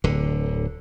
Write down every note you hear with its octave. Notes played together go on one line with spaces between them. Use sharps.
D1 D3